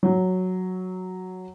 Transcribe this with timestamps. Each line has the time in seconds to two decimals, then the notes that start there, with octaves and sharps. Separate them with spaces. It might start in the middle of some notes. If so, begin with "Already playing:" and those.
0.03 F#3